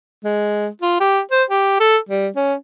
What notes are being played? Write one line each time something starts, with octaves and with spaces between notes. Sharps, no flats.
G#3
F4
G4
C5
G4
A4
G3
C#4